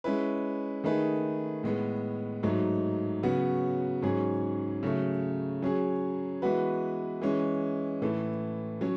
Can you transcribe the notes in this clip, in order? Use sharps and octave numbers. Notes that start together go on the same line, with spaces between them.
G#3 C#4 E4 B4
D#3 A3 D#4 G#4 B4
A2 G#3 B3
G#2 F#3 A3 D#4
C#3 F#3 B3 F#4
G#2 F#3 C#4 G#4
C#3 F#3 A3
F#3 C#4 G#4
E3 G#3 B3 F#4 B4
E3 G#3 C#4
A2 E3 A3
F#3 C#4